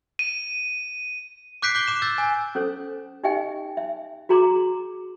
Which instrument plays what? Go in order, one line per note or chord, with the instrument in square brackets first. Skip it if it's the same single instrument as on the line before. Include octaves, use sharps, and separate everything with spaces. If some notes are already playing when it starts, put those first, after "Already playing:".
[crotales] D#7
[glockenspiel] D6 F#6 G6 B6 C7 D7
D6 F#6 G6 G7
D6 E7
E6 G6 A6
G#5
[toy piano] C#4 A4 C5
D#4 G4 D#5 E5 G5 G#5
E5
F#4 G#4 A#5 C6 D6